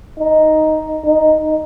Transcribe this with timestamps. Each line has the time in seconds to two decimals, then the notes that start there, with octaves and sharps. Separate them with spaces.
0.19 D#4
1.05 D#4